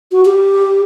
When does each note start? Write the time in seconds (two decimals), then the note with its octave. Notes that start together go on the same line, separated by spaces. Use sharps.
0.12 F#4
0.25 G4